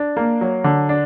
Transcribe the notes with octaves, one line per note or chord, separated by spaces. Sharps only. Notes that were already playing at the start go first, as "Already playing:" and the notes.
Already playing: D4
A#3
F#3
D3
D4